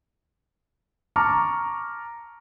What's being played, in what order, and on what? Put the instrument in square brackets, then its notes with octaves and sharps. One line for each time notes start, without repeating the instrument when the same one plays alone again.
[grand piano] A5 A#5 C#6 D6 F6